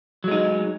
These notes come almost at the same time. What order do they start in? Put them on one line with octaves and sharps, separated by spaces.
F#3 G#3 D#4